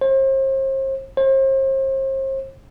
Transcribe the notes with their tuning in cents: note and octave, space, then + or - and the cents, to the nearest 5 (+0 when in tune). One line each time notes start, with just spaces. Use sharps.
C5 +40
C5 +40